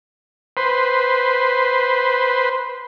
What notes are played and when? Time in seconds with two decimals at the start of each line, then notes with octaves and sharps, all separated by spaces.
0.57 B4 C5